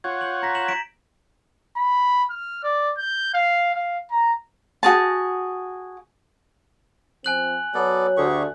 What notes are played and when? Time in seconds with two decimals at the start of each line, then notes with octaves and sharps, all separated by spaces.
0.04 F4 C#5 F#5 G#6
0.21 G6 D7 F#7
0.42 A#5 A#6 B6
0.55 E7 F#7
0.68 B6 D7 E7
1.77 B5
2.31 F6
2.63 D5
2.98 G6
3.34 F5
3.74 F5
4.11 A#5
4.83 F#4 G#4 A5
7.24 F3 C4 G#5 F#6 F#7
7.74 F#3 B3 A4 C#5 D5
8.17 D2 G4 G#4 C#6